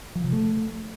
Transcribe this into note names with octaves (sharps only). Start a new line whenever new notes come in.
F3
C3
A3